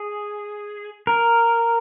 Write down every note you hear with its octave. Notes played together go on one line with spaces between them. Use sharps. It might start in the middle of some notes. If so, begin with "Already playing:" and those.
Already playing: G#4
A#4